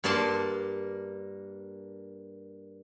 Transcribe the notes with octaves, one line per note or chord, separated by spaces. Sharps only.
G2 A#3 D5 A5 C6